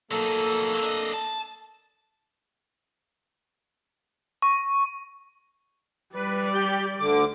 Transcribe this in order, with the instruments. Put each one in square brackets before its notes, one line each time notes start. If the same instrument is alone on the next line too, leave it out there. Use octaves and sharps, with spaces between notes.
[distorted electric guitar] F#3 D#4 [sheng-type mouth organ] A#3 A4 E6
[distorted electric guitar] D4 D#5
A5
[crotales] C#6
[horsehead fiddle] G3 D5 [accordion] B4
[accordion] G4 G6
D2 D3 D6